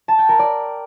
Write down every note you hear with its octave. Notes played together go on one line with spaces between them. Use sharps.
A5
G5
A#4
D5